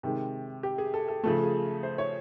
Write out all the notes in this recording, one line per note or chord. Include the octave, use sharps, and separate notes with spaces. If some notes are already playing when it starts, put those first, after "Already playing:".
C3 D#3 G#3
G4
G#4
A4
A4
C#3 F3 A3 A4
G#4
C5
C#5